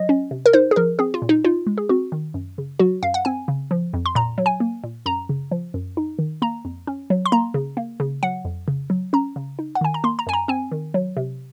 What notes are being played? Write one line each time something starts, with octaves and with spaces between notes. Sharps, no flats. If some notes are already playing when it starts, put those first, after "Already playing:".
Already playing: F#3 D#5
C#4
C3
A#4
D#4 C5
G#4
F3 A#4
C4 G#4
F4
A#2
D#4
D#4 F4
G#3
G#4
C4 F#4
D#3
F#2
C#3
F#3 F#4
F#2 F5
F#5
C4 G#5
C#3
F3
F2
C6
A#2 A#5
F#3
G#5
A#3
A#2
F#2 A#5
C#3
F3
F#2
D#4
D#3
A#3 A#5
F2
C#4
F#3
C6
A#3 A#5
C#3
A#3
C#3
F#3 F#5
F2
C#3
F#3
C#4 A#5
C#3
D#4
F#5
D#3 G#5
A#5
A#3 C6
A#5
F#2 G#5
A#5
C4 G#5
D#3
F#3
C3